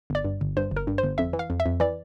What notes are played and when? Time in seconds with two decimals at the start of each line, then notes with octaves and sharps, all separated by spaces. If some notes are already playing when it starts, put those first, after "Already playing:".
0.10 G1 D5
0.24 G2
0.41 G1
0.57 G2 C5
0.71 G1
0.76 A#4
0.87 G2
0.98 C5
1.03 G1
1.18 F2 E5
1.33 E3
1.39 F5
1.50 F2
1.60 E5
1.66 F2
1.80 E3 D5